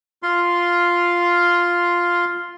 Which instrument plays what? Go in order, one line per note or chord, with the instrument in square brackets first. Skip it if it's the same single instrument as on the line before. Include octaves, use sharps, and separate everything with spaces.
[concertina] F4 C6